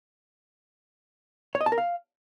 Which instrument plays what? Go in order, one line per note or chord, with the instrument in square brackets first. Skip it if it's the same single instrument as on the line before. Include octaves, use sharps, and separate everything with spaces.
[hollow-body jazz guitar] C#5
D#5
A5
A#4
F5